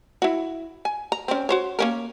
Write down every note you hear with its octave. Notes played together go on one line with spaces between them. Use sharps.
E4 F#4
G#5
A#5
C4 C#4
F#4 C5 C#5
A#3 C#4 A#4